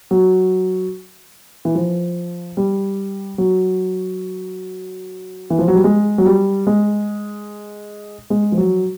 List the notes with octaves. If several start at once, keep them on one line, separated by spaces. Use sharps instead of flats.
F#3
E3
F3
G3
F#3
E3
F3
F#3
G3
G#3
F#3
G3
G#3
G#3
F3
F#3